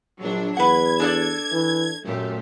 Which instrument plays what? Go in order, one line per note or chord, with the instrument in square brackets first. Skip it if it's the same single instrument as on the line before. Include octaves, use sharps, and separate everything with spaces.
[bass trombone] A#1 [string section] F#3 D4
[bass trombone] E2 [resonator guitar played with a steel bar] B4 F#5 [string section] G#6
[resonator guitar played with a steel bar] D4 A4 D5
[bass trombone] E3
[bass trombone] F#2 [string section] A#2 A3 G4